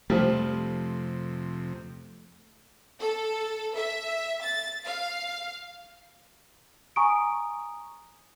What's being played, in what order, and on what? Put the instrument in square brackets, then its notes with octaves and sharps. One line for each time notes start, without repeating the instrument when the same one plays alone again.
[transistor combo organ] F2 C3 [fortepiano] F3 G3 [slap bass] A3
[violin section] A4
E5
A6
F5
[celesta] G#5 A#5 C#6 D#6 D7